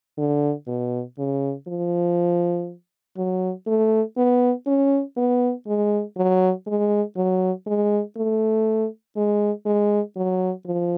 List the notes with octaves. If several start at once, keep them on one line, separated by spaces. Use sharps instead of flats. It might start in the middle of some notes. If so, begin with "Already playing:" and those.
D3
B2
C#3
F3
F#3
A3
B3
C#4
B3
G#3
F#3
G#3
F#3
G#3
A3
G#3
G#3
F#3
F3